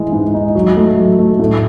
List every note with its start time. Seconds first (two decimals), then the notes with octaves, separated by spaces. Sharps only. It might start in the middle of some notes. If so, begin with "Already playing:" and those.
Already playing: E3 G#3
0.12 G#2
0.34 D#4
0.55 F#3
0.77 A3
0.97 F#3
1.19 A3
1.39 A2